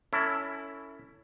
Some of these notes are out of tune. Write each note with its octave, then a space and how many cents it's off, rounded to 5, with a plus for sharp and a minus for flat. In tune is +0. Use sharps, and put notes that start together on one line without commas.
C#4 +20 E4 +0 A4 +30